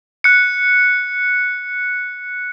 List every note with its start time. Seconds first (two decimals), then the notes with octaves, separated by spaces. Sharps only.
0.24 F#6 C#7